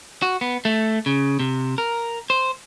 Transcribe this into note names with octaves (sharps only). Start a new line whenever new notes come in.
F#4
B3
A3
C#3
C3
A#4
C5